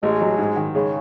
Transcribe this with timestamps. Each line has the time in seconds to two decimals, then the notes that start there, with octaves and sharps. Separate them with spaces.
0.03 A1 G#3
0.21 F#3
0.38 G#2
0.56 D#3
0.75 C#3 G#3